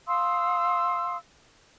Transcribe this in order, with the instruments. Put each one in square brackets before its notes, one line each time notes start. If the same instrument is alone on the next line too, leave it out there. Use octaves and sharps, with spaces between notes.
[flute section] F5 C6 D#6 E6